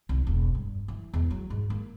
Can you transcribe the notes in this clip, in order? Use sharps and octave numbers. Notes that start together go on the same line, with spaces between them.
C2
E1
G2
E3
E2
F#3
G#2
A#3